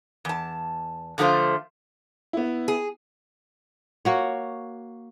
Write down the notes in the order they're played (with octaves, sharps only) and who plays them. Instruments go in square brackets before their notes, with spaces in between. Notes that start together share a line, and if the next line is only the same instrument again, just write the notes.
[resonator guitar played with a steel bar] E2 A5
D3 F3 A3 F4 C5
[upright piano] B3 E4
[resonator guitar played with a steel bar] G#4
[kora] A#3 F#4 C#5